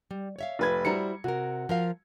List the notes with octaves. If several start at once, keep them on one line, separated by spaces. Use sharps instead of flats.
G3
C#5 E5 F5
F1 B4 G#6
G3 E4 F#4 C5 A#5 C#7
C3 F#4 A#4
F3 A#4 F5